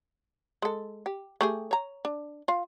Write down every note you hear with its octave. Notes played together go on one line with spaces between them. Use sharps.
G#3 A4
G4
A3 G4 G#4
C#5 A#5
D4
F4 F5